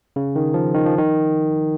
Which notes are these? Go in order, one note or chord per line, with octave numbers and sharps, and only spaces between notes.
C#3
D#3
F3
D#3
F3
D#3